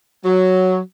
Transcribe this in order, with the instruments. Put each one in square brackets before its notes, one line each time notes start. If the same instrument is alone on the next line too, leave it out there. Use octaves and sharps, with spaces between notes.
[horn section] F#3